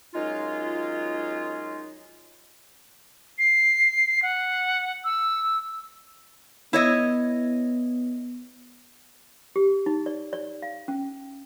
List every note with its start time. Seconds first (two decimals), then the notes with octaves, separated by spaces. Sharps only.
0.15 F#2 G#3 D#4 F4
3.38 C7
4.22 F#5
5.04 E6
6.73 B3 E4 C#5 D#5
9.56 G4
9.86 D#4
10.06 D5
10.33 D5
10.62 F5
10.88 C#4